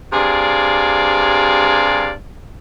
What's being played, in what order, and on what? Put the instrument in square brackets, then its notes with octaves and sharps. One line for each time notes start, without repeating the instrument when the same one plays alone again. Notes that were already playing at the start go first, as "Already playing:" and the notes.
[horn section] G2 C3 G#4 D5 F5